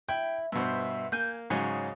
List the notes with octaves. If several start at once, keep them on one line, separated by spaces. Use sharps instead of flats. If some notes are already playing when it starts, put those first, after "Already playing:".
E4 G5
G2 B2 C5 E5
A#3 G#5 G6
G#2 C#3 F#3 C#5 D#5